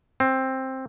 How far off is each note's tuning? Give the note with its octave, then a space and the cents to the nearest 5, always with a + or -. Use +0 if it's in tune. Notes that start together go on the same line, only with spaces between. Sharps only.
C4 +10